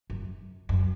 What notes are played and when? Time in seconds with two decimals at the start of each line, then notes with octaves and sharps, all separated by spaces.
0.10 F#2
0.69 F#2